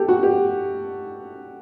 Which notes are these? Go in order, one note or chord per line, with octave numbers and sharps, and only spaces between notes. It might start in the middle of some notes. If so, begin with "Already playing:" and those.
Already playing: G4 A4
F#4
G4